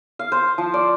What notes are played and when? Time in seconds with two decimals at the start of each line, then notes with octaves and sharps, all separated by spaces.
0.19 F5
0.32 C5
0.58 F3
0.74 D5